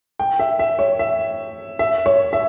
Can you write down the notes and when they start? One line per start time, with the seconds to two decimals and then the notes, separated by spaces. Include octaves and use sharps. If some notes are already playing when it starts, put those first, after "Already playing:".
0.19 G5
0.39 E5
0.59 E5
0.79 C#5
0.99 E5
1.79 E5
2.06 C#5
2.33 E5